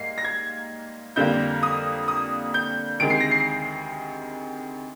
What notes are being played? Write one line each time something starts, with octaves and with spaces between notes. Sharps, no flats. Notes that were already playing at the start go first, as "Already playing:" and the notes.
Already playing: G#2 G3 A#3 C7
A#6
G#6
F2 D3 G3 A#3 G6
D#6
D#6
G6
D2 C3 D#3 G#3 D7
C7
A#6
C7